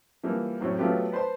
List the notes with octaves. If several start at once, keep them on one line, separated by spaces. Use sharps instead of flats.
E3 F3 G3 A#3
F#2 A2 C4 F#4 C#5
F3 F#3 A3 B3 F4 G4
B4 C5 A5 C6